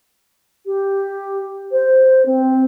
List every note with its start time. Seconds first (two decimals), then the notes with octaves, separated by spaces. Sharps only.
0.66 G4
1.71 C5
2.25 C4